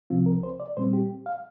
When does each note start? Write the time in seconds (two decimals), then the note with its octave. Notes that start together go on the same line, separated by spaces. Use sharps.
0.10 C2 C3 F3 C4 F4
0.26 A#4
0.43 C5
0.60 D5
0.77 A#2 G3 C4 C5
0.93 G4
1.26 F5